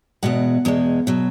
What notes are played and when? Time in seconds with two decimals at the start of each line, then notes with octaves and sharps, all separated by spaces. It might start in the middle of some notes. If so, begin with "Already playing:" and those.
0.23 E2 B2 G#3 F#5
0.65 E2 B2 G#3
1.07 B2 F#3